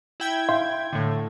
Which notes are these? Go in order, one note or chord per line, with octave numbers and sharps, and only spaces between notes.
E4 G5 G#6
E5 F5 C6
A2 D3